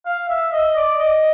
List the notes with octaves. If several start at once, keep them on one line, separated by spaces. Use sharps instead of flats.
F5
E5
D#5
D5
D#5